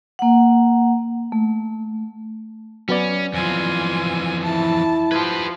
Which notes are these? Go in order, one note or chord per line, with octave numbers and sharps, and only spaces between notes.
A#3 F#5
A3
F#3 B3 C#4 D5
F2 E3 F4 G#5
E4 A5
F3 G4 B4 G#6